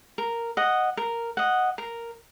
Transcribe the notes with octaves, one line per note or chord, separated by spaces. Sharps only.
A#4
D#5 F#5
A#4
D#5 F#5
A#4